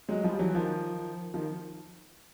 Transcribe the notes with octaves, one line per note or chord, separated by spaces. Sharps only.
F#3 G#3
F3 G3
E3 F#3
D#3 F3
D#3 F3